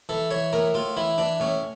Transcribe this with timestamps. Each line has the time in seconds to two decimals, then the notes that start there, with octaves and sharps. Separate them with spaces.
0.09 E3 A4
0.31 E3 C#5
0.53 A2 A#4
0.74 A2 F4
0.97 E3 E4
1.18 E3 D4
1.40 A2 C#4